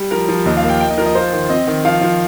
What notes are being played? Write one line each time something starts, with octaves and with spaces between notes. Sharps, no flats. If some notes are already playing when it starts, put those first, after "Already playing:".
Already playing: G3
F3 A#4
F3
D#2 D#5
F5
A#3
G5
D#4 G5
D#5
F3 A#4
D#5
F4 C5
D#3
C4 D#5
D#3
F3 F5
F3